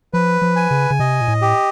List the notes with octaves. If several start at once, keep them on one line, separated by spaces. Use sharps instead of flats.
F3 B4
F3
G#5
C#3
C#3
C3 D#5
A#2
A2
G4